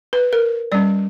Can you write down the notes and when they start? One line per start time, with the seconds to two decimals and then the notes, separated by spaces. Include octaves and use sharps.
0.13 B4
0.33 A#4
0.72 G3 C#4 D5